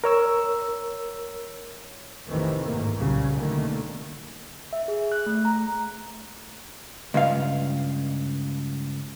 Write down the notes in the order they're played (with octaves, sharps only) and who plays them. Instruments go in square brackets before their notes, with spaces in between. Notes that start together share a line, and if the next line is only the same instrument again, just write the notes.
[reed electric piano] A#4 C#5 E6
[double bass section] A1 F2 C3 D#3 E3 A3
G#1 A2 A#3
C2 A#2 C#3 F#3 G3
B2 D3 D#3 A3 A#3
[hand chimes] E5
G#4
F#6
A3
A#5
[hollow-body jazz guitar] C#2 G2 F5